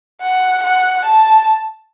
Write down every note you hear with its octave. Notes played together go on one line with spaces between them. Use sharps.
F#5
F#5
A5